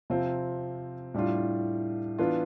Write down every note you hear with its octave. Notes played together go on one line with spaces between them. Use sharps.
C3 F3 C4 F4
A2 G3 D4 F4
E3 B3 D4 F4